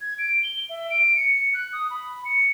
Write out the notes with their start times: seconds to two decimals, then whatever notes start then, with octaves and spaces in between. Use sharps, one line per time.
0.01 G#6
0.19 D7
0.43 G7
0.70 E5
0.90 D7
1.16 C#7
1.54 F#6
1.73 D#6
1.91 B5
2.25 C#7